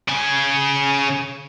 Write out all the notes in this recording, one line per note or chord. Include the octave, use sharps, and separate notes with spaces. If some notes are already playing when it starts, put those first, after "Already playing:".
C#3 G#5